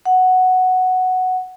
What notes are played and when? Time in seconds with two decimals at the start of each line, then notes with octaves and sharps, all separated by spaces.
0.05 F#5